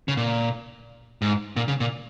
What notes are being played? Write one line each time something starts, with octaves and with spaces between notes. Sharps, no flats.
C#3
A#2
G#2
A#2
C#3
A#2